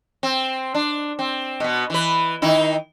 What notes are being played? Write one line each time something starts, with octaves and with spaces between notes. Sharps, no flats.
C4
D4
C4
B2 B3
E3 B4
D#3 D#4 E4